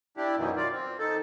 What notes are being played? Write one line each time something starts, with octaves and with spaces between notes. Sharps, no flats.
D4 E4 G4
F#2 B2 D#3 E3
F4 D5
C4
D#3 A4